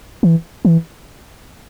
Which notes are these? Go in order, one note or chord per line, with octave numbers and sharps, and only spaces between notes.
E3
E3